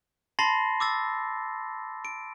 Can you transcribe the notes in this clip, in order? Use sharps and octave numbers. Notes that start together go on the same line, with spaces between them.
A5 B5 C6 A6 A#6 C7
D6 E6 A6
D7